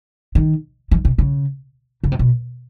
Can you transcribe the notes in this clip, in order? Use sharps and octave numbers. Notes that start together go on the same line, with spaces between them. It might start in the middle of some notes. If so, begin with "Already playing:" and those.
D#3
E3
C3
C#3
C#3
C3
B2